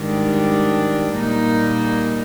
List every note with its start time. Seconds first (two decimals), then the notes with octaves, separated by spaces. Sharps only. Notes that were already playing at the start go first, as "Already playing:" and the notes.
Already playing: G#2 D#3 G3 D4
1.16 A#2 G3 A#3 D#4